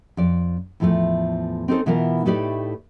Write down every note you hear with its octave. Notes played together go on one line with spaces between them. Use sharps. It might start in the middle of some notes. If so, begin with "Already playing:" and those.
F2 D5
E2 A2 F3 G#3 A3
C4 C#4 D#4 G4 A4 C5
B2 E3 B3 E4 F4 A#4
A2 A3 D#4 G4 B4 D5